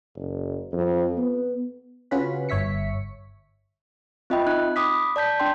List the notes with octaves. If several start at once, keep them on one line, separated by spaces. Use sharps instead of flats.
F#1
F2
B3
C#3 C#4 F4 F#4 B4 B5
G1 C#5 E5 B6 C#7
C4 F4 D#5 E5 G5 B5
D#4 F#6
B5 D6 D#6 B6
D5 A5 G6 B6
D4 G5 C6